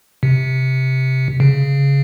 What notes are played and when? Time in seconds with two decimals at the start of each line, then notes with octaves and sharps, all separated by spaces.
0.23 C3
1.40 C#3